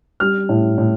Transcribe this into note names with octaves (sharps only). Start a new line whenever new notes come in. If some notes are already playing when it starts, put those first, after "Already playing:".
G3 F6
A2
A2